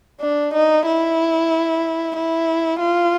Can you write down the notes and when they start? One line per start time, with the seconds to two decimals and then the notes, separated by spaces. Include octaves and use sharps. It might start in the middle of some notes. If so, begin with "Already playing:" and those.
0.21 D4
0.54 D#4
0.86 E4
2.16 E4
2.80 F4